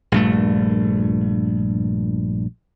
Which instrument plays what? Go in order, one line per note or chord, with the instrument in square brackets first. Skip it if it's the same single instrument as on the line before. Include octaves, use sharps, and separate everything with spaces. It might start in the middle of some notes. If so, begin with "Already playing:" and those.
[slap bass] A#1 G2 A3